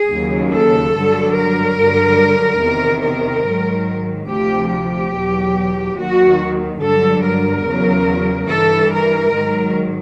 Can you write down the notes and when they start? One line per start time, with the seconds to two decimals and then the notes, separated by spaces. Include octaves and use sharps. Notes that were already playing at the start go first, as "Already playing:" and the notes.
Already playing: G#4
0.11 D#2 C#3 F#3
0.54 A4
0.96 G2 D3 F#3
1.37 A#4
1.79 G2 D3 F#3
2.63 E2 C3 D#3
3.06 A#4
3.48 G#2 D#3 F#3
4.31 D2 C3 F3 G4
4.73 G4
5.16 E2 B2 F#3
5.99 D#2 D#3 F#3 F#4
6.83 G2 D3 F#3 A4
7.25 A#4
7.67 E2 C#3 F#3
8.51 G2 E3 A4
8.94 A#4
9.35 G#2 D#3 F#3